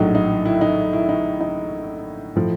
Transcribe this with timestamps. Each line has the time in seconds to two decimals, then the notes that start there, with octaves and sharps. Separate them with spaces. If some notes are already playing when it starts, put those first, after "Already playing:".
Already playing: A#1 A2 F#3 D#4
0.15 D#4
0.46 E4
0.61 D#4
0.93 E4
1.09 D#4
1.41 D#4
2.36 A2 F3